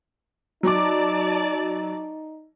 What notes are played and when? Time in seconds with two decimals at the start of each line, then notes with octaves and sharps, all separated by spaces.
0.63 F#3 D#4 D5 A5 D6